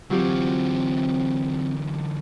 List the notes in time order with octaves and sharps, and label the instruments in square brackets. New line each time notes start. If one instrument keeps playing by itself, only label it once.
[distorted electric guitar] D2 E3 [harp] F#3 F4 G4 [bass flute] C4